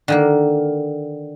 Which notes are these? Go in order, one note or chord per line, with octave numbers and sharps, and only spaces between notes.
D3 D#3 A#3